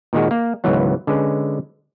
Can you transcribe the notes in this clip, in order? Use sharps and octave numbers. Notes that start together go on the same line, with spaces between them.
A#2 D#3 G#3 F#4
A#3
C#2 G#2 D#3 E3 F#3 B3
D3 G#3 C#4 B4